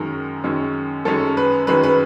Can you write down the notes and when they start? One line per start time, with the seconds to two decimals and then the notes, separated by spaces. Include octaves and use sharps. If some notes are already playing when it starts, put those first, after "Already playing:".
Already playing: F#2 D#3 G#3 C#4 A#4
0.44 F#2 D#3 G#3 C#4
1.05 F#2 D#3 G#3 C#4 A4
1.37 B4
1.67 F#2 D#3 G#3 C#4 B4
1.84 B4